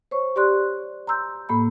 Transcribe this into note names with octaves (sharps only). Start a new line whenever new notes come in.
C5 C#5 C#6
G4 D5 C6 F#6
A#5 C6 E6 G6
A2 A#3 B5